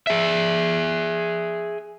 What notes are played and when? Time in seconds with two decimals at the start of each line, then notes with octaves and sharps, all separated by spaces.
0.07 G#4 E5